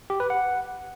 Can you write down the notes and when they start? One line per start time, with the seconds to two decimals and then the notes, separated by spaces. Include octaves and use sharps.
0.10 G4
0.20 B4
0.30 F#5